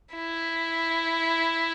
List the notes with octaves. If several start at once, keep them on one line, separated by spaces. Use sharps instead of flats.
E4